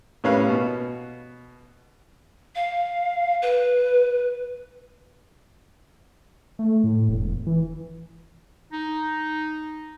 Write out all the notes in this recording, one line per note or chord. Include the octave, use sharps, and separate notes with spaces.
A2 G3 C#4 B4 F5 F#6
B2
F5
B4
A3
A2
E1
E3
D#4